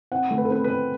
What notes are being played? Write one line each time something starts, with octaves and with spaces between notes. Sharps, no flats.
C4 F#5
A3
B4
A4
C4 B4
B4
C4